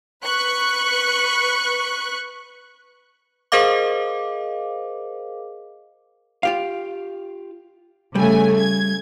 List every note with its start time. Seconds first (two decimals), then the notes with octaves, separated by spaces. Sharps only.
0.23 B4 C#6 F#6
3.52 G#4 A#4 C5 D#5 F5 D6
6.43 F4 G4 F5
8.15 C#3 G3 A3 G#5
8.58 G#6